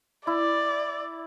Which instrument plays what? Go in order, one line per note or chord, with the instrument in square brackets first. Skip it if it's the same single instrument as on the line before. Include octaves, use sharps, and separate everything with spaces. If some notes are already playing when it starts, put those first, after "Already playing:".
[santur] E4 [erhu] D5